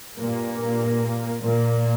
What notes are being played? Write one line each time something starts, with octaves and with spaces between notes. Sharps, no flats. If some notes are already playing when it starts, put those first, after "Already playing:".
G2 A#2 A#3
A#2 A#3